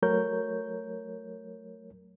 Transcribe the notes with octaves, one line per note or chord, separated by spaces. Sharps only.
F#3 A3 A#4 C#5 G6